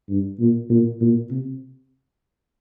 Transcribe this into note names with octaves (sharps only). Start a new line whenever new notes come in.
G2
A#2
A#2
A#2
C3